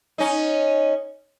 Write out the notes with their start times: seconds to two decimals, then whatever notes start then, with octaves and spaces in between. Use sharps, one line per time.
0.18 C#4 D#4